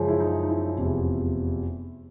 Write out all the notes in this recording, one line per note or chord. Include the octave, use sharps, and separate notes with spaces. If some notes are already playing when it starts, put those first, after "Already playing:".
Already playing: F#2 C#3 F3 G#3
E4
D#4
D#4
E4
F1 E2 C3 F3